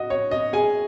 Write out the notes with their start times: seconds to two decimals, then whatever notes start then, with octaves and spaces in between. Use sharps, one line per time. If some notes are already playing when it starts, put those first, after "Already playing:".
Already playing: F#4 D#5
0.10 C#5
0.31 D#5
0.53 G#4 G#5